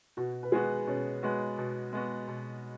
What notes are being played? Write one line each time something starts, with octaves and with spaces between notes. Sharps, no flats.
B2 F#4
B4
G#3 B3 F#4 G#4
B2 C#4
G#3 B3 F#4
B2
G#3 B3 F#4
B2